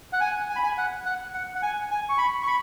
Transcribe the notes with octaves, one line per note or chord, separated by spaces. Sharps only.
F#5
G#5
G#5
B5
G#5
F#5
F#5
F#5
F#5
G#5
G#5
C#6
B5
C#6
B5